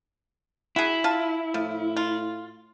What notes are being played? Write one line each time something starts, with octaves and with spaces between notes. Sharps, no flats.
E4 F#4 G#4
F4 A5
A2 F3
F4